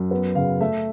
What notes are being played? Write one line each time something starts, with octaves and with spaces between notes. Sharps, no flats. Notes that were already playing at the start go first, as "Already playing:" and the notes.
Already playing: F#2
B3
C#3 F5
A3 E5